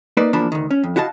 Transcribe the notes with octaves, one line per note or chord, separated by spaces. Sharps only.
A#3 D#4 B4 D5
E2 F3 A#3 D4 A5 B5
D2 D#3
C#4
F2
E4 F#4 D#5 F5 A5